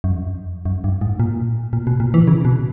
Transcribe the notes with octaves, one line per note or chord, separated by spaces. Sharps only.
F#2
F2
F#2
G2
G#2
A#2
A#2
B2
A#2
E3
C#3
B2